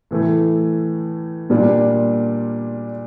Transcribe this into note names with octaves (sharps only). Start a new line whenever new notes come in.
A2 E3 A3
A#2 G3 A#3 D4 F4